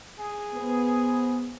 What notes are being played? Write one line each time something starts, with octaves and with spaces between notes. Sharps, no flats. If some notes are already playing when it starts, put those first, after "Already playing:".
G#4
B3 C5